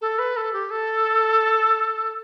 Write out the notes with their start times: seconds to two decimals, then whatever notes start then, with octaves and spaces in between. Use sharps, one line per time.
0.01 A4
0.19 B4
0.37 A4
0.53 G4
0.71 A4